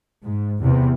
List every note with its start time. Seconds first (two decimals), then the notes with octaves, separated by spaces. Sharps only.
0.24 G#2
0.61 E2 C3